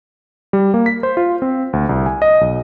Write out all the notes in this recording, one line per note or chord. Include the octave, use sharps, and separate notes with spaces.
G3
A#3
B6
C5
F4
C4
D2
C2
G#5
D#5
B1